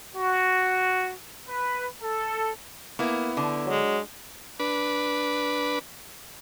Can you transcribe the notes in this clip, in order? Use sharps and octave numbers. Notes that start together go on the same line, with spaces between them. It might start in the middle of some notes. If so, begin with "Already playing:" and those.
F#4
B4
A4
A#3 B3 E4
D3
F#3 G#3
D4 B4